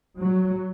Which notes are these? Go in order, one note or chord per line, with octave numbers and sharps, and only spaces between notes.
F#3